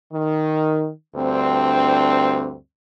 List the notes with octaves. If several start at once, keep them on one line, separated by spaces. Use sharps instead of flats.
D#3
D2 G2 C4